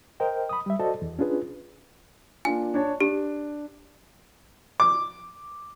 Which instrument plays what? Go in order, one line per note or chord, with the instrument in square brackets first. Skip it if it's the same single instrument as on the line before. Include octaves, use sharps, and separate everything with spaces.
[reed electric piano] A#4 C5 D#5 G5
B5 D#6
G3 E5
F#4 A4 C5 D5 D#5 A5
E2
C#4 D4 F4 G#4 B4
[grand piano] A#3 D4 F4 [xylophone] G#5
[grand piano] D4 C#5 A5
[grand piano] D4 [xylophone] G4
[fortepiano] D6